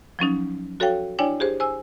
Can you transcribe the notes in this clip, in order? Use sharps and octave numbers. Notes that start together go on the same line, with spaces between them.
F3 F#3 C#4 D#4
F#4 A4 C#5 F5 G5
D4 E4 C#5 D5 G5 G#5
G4 G#4 C5
C5 G#5 E6